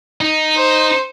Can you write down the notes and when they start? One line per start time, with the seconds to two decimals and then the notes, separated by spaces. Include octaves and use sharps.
0.21 D#4
0.57 C5